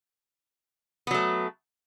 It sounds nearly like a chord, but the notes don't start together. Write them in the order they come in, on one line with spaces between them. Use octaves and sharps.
B3 F#3 A3